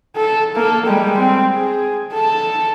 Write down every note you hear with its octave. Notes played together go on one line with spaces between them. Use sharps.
A4
A#3 A4
G3 G#3
C4
G#4
A4 A5